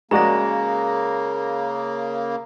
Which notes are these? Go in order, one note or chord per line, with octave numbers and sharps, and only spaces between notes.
C#3 G#3 A#3 F#4 D5 A#5 A#6